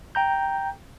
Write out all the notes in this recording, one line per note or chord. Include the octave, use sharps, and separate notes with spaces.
G5 A#5 G6